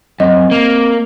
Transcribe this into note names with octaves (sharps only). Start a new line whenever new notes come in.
F#2 C4 D#5
A#3